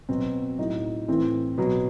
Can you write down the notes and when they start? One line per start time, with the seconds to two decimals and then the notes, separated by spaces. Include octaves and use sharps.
0.09 B2 F#3 C4
0.58 A2 F#3 D#4
1.08 A2 E3 C4
1.58 B2 F#3